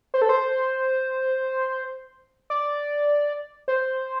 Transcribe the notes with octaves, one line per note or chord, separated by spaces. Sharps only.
C5
A4
C5
D5
C5